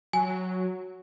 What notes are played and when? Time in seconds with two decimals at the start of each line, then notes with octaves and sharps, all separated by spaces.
0.13 F#3 G#5